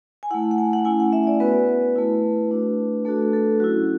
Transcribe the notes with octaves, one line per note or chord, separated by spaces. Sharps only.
G#5
A3 E4 F#5
F#5
G#5
F#5
A3 C#4 E4 G#5
F#5
E5
D5
B3 F#4 B4
A3 E4
A3 D4 F#4
A3 D4 F#4 A4
A4
F#3 C#4 E4 F#4